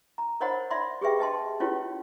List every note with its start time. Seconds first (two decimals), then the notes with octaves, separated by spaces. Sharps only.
0.18 A#5
0.41 A#4 C5 C#5 D#5 F#5 B5
0.70 D5 E5 B5 C6
1.01 G4 G#4 B4 E5 G5
1.19 B4 D#5 A5 C6
1.60 C#4 E4 F4 G4 B4 C#5